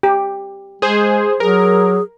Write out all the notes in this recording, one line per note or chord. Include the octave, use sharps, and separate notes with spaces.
G4
G#3 G#4 C5
F#3 G#4 A#4